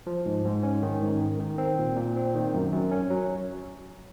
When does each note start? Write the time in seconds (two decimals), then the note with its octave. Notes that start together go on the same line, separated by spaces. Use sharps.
0.07 F3
0.26 G#2
0.45 G#2
0.63 C#4
0.82 D#3
1.02 G#2
1.21 D#3
1.40 D#3
1.58 C4
1.78 A#2
1.96 A#2
2.16 C4
2.35 D#3
2.54 F#2
2.73 F#2
2.92 C#4
3.10 F#3